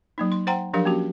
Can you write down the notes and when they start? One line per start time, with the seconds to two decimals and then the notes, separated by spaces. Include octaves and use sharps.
0.18 F#3 A#3 D#4
0.32 C6
0.47 C5 F#5 G5 A#5 C6
0.73 F3 F#3 D4 G4 A#4 F5
0.85 A#3 C#4 F#4 G4